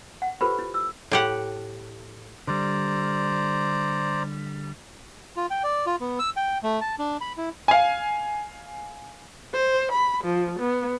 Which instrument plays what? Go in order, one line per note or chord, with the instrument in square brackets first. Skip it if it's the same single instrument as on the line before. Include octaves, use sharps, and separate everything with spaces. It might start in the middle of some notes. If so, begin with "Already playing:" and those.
[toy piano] F#5
F4 G4 A4 B4 C5 B5
E4
E6
[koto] A2 G4 F#5
[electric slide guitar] D3 G3 [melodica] C5 D5 A#5
[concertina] F4
G5
D5
F4
B3
E6
G5
A3
A5
D4
B5
E4
[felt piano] F5 G#5
[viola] C5
B5
F3
B3